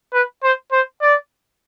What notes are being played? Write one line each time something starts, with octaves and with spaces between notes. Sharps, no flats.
B4
C5
C5
D5